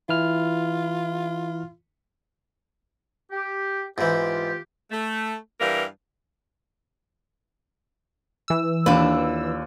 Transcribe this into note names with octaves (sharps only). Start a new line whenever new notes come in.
E3 E4 F4 F6
G4
G#2 E3 F4 G4
A3
G2 E3 G3 A#4 F5
E3 E6
D#2 D4 F4 B4